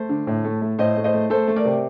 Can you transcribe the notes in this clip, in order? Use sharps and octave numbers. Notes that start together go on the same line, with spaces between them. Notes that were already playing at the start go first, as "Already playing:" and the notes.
Already playing: A3 C5
D3
A2
A3
A3
A2 C5 D#5
A3
C5 D#5
A3
A3 A4 C5
A3
A#4 D5
C3